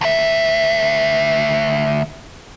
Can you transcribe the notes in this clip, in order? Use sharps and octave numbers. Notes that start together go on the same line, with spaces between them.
D2 E5